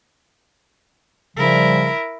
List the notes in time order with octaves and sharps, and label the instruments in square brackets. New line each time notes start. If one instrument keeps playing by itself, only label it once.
[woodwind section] C#3 F3 G3 [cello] E4 A#4